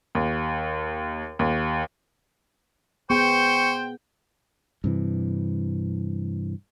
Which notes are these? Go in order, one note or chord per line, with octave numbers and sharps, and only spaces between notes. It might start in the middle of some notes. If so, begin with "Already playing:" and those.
D#2
D#2
B3 G#4 C5 G5 C#6
G2 C3 E3